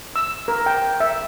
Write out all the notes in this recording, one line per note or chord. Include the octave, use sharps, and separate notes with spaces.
E6
A#4
G5
E5